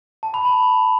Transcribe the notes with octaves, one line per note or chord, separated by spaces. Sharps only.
A5
B5
A5